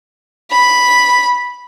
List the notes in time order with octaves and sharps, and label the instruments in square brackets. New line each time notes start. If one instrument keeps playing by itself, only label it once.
[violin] B5